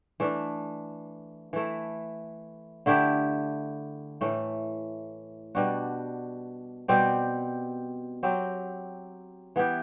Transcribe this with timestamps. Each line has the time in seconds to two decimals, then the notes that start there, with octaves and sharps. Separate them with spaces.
0.20 E3 A3 D4
1.53 E3 A3 E4
2.86 D3 A3 E4 G4
4.21 A2 E3 A3
5.55 B2 G3 D4 F#4
6.88 B2 G3 C4 G4
8.23 F#3 C4 G4
9.56 E3 B3 E4 G4